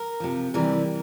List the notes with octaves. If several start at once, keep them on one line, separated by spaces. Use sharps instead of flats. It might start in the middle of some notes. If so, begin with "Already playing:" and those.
Already playing: A#4
C3 F3
C3 E3 G3 A#4